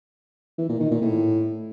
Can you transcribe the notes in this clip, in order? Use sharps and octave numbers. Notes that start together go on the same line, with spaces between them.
E3
A#2
D#3
A#2
A2